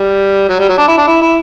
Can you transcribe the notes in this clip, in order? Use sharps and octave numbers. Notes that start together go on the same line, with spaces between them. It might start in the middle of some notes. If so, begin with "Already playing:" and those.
Already playing: G3
F#3
G3
F#3
D4
E4
D4
E4
E4